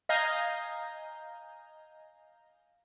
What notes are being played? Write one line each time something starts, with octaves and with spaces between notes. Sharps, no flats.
D#5 F5 G#5 A#5 G6